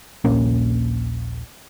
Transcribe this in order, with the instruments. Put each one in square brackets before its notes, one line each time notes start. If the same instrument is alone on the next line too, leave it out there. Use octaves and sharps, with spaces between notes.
[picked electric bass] D#1 A#1 A#3 C#4